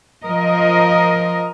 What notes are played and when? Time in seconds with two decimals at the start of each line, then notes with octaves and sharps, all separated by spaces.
0.23 F3 A#4 D#5